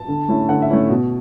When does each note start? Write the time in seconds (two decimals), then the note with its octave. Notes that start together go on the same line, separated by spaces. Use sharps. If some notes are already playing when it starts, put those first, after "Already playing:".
Already playing: A5
0.08 D3
0.29 A3 C#4 E4
0.49 D3 F#5
0.62 E5
0.70 A3 C#4 E4
0.89 B2